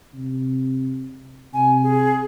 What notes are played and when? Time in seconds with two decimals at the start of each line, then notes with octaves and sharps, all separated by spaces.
0.14 C3
1.54 C3 G#5
1.83 G#4